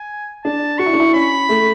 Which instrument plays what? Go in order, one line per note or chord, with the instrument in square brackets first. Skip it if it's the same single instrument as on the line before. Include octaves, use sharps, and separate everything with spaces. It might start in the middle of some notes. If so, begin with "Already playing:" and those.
Already playing: [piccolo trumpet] G#5
[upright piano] D4 [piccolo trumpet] A5
[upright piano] F#4 [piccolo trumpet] C#6
[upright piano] E4
D4
E4
[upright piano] C#4 [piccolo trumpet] B5
[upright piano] A3